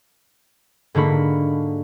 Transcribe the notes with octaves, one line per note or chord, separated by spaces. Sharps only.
G#2 D3 A#3 F#4 B5